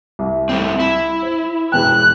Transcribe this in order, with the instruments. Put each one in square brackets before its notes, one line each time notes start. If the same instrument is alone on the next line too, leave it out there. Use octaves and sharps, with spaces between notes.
[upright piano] C2
[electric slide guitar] G3 A3 C4
E4
[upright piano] C5
[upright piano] E1 E2 G5 [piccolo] F#6